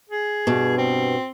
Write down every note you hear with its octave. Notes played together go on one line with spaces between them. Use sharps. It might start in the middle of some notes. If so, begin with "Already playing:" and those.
G#4
G2 B2
C4